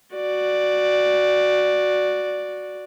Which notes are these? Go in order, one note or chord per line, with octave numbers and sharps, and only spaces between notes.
F#4 D5